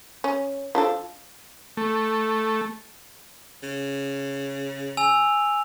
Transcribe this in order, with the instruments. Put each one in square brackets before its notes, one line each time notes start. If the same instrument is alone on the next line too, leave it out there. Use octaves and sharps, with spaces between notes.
[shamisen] C#4
F3 D4 A4
[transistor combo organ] A3
[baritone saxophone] C#3
[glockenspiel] G#5 E6 F7